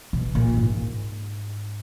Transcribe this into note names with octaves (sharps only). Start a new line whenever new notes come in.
B2
A#2
G#2